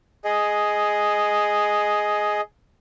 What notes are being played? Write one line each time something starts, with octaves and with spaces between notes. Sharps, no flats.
G#4 D#5